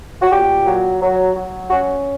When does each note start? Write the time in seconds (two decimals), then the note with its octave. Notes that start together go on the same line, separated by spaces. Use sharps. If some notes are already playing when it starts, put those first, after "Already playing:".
0.22 F#4
0.32 A#2 G4
0.67 F#3
1.02 F#3
1.36 F#3
1.70 C#4 F#4